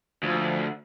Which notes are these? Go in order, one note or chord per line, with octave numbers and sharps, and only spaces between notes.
D2 F3